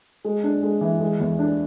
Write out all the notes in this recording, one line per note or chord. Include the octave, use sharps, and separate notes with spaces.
G#3
D4
G#3
E3
G#3
E2
D4